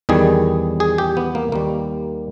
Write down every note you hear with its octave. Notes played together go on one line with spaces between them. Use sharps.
E2 D#3 G3 G#4
G#4
G4
B3
A#3
D#2 D#3 G3 A#3